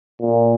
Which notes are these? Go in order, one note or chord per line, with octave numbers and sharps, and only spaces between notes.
A#2